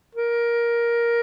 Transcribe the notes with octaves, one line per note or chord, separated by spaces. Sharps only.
A#4